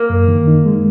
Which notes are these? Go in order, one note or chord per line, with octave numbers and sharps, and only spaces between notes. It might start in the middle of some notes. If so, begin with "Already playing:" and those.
Already playing: A#3
F#2
D#3
D#4
G#3